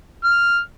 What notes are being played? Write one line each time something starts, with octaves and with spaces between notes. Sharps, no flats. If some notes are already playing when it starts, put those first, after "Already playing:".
F6